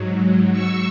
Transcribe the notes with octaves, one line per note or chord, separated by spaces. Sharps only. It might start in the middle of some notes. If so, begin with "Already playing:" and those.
Already playing: G#2 F#3
C#6 E6